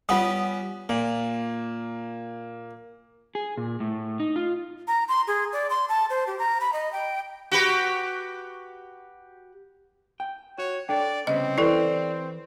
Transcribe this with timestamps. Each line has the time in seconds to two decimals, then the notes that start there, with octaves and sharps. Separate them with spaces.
0.09 G3 B3 C#4 F4 F#5 D#6
0.89 A#2 A#3
3.35 G#4
3.58 A#2
3.80 A2
4.20 D#4
4.36 F4
4.88 A#5
5.08 C6
5.27 G#4
5.53 D5
5.70 C6
5.89 A5
6.10 C5
6.27 G4
6.39 A#5
6.61 B5
6.73 D#5
6.93 G5
7.52 F#4 G4 B4
10.20 G5
10.58 F#4 C#5
10.89 D4 A4 D5 G5
11.27 C2 C#3 B3 C4 D#5
11.58 E3 E4 G4 A4 B4 C5 D5